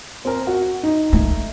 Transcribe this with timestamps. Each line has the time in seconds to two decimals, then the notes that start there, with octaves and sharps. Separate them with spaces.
0.25 C4 A#4
0.47 F#4
0.83 D#4
1.13 A3